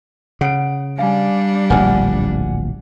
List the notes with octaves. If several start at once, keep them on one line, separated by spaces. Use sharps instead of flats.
C#3 F#5 D7
G3 D4 F5 G#5
D1 A#1 F#5 G#5 F6